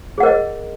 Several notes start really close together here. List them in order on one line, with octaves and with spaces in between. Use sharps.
G#4 F#5 A#4 D#5